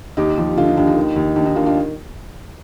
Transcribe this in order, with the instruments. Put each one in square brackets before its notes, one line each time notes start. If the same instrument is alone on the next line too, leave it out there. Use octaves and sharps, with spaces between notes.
[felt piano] D#2 D#4 G4
F3
D3 F4
D#4
D#2 D4
D#4
D#3
D#2
D#2 D4
D#4
D#3 D4 F4
D4 F4